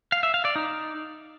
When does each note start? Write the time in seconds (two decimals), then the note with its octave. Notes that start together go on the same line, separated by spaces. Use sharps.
0.12 F5
0.23 E5
0.34 F5
0.45 D5
0.56 D#4